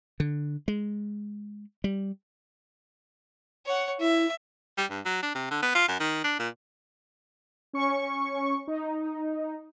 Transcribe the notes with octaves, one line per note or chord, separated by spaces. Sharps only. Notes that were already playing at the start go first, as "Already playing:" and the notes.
D3
G#3
G3
C#5 F#5
E4 E5
G3
G2
F#3
D4
C3
D3
B3
F4
F#2
D#3
D4
A#2
C#4 C#6
D#4